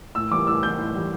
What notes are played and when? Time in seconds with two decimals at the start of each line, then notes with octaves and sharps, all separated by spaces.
0.15 A2 E6
0.31 E3 G3 D6
0.47 A2 E6
0.63 E3 G3 G6
0.79 A2
0.95 E3 G3